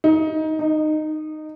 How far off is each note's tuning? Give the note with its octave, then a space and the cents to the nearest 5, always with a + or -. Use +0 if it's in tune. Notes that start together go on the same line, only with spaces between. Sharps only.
D#4 +20
D#4 -15